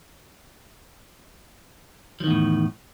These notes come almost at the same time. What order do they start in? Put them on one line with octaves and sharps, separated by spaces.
F3 D#3 E2 A2